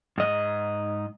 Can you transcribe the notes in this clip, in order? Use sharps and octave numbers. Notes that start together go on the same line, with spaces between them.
G#2 D#5